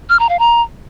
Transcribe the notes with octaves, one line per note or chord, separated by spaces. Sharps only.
F6
A#5
F5
A#5